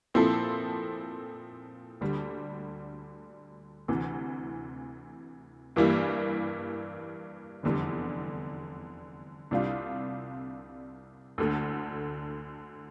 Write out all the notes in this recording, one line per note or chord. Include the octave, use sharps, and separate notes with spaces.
A#2 F3 C4 E4 A4
D2 D3 G3
D2 C3 E3
G2 E3 G3 A#3 E4
F1 E2 D3 G3
C2 C3 G3 D4 F4
D2 D3 A3